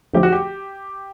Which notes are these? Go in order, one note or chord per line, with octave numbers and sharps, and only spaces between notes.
D3 F3 A3 C4 G4
F#4
G4